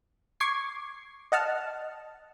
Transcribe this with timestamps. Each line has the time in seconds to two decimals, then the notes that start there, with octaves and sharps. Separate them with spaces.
0.40 C#6 D6 G#6 C7
1.32 D#5 F#5 A5 F6